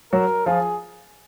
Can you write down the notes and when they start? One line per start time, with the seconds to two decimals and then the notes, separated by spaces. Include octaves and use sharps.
0.13 F#3 F#4 A#4
0.46 F3 F4 G#4